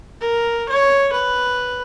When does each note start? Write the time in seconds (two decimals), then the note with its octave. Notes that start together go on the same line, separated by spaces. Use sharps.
0.21 A#4
0.69 C#5
1.13 B4